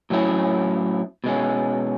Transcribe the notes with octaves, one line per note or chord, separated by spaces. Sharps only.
A2 F#3 C#4 E4
B2 G#3 C#4